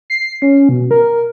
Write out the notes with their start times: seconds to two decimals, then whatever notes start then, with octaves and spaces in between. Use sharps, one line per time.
0.10 C7
0.42 C#4
0.69 B2
0.91 A#4